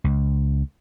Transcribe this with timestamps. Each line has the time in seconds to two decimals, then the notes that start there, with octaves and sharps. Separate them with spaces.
0.04 C#2